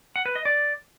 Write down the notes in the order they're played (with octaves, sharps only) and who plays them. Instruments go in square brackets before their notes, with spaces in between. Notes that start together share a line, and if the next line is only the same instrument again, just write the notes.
[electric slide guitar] F#5
B4
D#5
D5